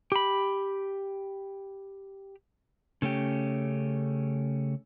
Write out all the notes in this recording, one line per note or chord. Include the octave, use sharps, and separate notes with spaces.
G4 B5
C#3 A3 C#4 G4